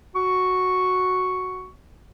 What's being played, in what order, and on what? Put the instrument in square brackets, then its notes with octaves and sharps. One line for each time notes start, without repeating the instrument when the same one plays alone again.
[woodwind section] F#4 C#6